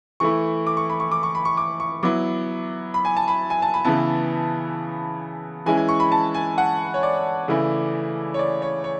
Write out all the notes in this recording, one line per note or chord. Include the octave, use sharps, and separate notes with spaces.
E3 A3 E4 C#6
D6
C#6
B5
C#6
D6
C#6
B5
C#6
D6
C#6
F#3 B3 E4 D6
B5
G#5
A5
B5
G#5
A5
B5
C#3 E3 B3 E4 A5
E3 G#3 C#4 E4 G#5
G#5
C#6
B5
A5
G#5
F#5
C#5
D5
C#3 E3 A3 E4
C#5
D5
C#5
C#5